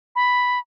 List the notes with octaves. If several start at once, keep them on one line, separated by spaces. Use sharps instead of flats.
B5